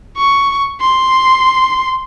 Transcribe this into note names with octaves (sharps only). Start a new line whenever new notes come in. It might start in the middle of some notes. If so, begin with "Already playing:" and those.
C#6
C6